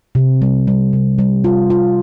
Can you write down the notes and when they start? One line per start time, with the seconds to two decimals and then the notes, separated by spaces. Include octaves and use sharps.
0.15 C3
0.42 G3
0.67 G3
0.93 C3
1.19 G3
1.44 F4
1.70 F4